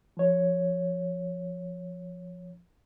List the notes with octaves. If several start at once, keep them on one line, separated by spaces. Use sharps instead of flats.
F3 C#5